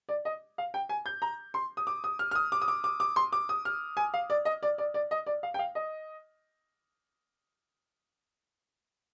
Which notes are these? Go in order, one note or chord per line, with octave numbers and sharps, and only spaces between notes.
D5
D#5
F5
G5
G#5
G6
A#5
C6
D#6
D6
D#6
F6
F6
D#6
D6
D#6
D6
D6
D6
C6
D6
D#6
F6
G#5
F5
D5
D#5
D5
D5
D5
D#5
D5
F5
G5
F5
D#5